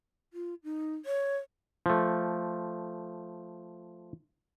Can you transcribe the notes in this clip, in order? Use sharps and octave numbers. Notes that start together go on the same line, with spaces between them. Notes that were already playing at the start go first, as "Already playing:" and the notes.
F4
D#4
C#5
F3 A3